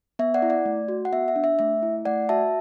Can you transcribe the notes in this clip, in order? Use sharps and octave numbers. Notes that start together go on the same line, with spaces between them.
B3 E5
D5 F#5
E4
D5
A3
F#4
F#5
B3 E5
E5
D4
E5
A3 E5
E4
A3 D5 F#5
F#4 E5 A5